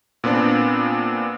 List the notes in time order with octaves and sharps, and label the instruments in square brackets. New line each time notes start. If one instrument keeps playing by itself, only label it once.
[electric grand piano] A#2 B3 C4 D4